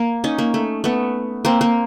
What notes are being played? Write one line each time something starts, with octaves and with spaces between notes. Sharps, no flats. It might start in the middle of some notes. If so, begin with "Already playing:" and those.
Already playing: A#3
C#4 D#4
A#3
A3
A3 B3
A#3 C4
A#3